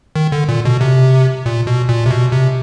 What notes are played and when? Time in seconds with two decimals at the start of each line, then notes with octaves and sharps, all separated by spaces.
0.16 D#3
0.32 D3
0.49 A#2
0.65 B2
0.81 C3
1.46 A#2
1.67 B2
1.89 A#2
2.06 C3
2.11 B2
2.32 C3